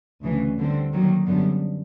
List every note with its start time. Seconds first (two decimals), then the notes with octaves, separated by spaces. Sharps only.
0.23 D2 C#3 E3
0.58 D3 G3 C4
0.93 D#3 F#3 A#3
1.26 F#2 D3 G3 B3